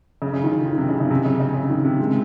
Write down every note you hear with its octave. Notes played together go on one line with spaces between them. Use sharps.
C#3
C#3
D#3
D#3
C3
C#3
C#3
C3
C#3
C#3
C#3
D#3
C3
G#3